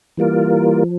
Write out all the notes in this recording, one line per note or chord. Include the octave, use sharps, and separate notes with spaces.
E3 G3 A#3 F4 A#4
F3